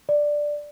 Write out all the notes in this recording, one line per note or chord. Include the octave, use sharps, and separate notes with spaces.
D5